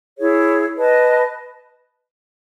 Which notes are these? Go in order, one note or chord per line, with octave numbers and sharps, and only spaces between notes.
E4 G#4 C#5
B4 D#5 A5